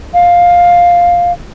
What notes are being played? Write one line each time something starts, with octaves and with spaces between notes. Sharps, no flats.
F5